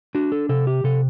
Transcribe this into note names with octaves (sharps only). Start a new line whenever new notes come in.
D4 F#4
A4
C3 A4
G4
C3 A4